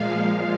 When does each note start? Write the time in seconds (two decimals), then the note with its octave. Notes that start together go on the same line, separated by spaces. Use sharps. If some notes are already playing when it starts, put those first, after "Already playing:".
Already playing: A#2 F3 G#3 F5